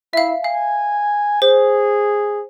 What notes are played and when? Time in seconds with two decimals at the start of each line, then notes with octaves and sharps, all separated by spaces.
0.13 E4 E5 F5
0.44 F5 G#5
1.42 G#4 C5